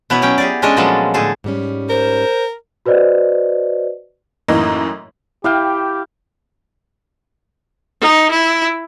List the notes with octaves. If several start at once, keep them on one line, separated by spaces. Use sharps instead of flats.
B2 B3 E4 C#5
F#3 C#4 G5
G4 G#4 D5
G#3 C#4 D4 A4 D5 D#5
A#2 F3 F#3 G#3 B3 A4
A2 D3 G#4 A4
G#2 G3 C#4
A#4 C5
F#4 B4 C5 D5 D#5
F#2 A2 E3 A#3 D#4 D#5
E4 G4 E5 F5 G5
D#4
E4